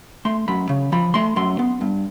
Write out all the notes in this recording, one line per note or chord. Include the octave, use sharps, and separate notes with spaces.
A3 C6
F#2 B5
C#3
F3 B5
A3 C6
F#2 C6
B3
G2